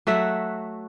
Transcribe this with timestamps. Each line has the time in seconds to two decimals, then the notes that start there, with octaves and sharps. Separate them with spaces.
0.07 F#3 A3 F#4 E5